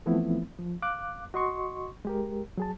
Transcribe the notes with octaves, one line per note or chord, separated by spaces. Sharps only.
E3 F3 A3 B3 C4 E4
F3
F5 D6 F#6
F#4 D#5 C6 C#6
G#3 G4 A#4
F#3 G#4 A5